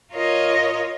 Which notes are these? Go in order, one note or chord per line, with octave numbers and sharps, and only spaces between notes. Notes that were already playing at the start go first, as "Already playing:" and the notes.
F4 A#4 C#5 D#5